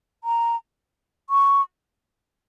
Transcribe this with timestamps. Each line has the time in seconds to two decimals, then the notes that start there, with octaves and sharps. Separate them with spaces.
0.24 A#5
1.30 C#6